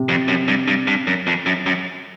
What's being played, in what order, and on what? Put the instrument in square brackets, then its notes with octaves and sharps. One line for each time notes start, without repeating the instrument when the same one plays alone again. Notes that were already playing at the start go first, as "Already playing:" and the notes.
Already playing: [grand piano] C3
[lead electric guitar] F2
F#2
G2
G2
G2
F#2
F2
F#2
F#2